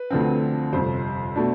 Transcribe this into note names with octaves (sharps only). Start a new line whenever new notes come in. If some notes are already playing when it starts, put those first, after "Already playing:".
Already playing: B4
D2 D3 F3 C4
G1 F2 C3 C5
B2 A3 D4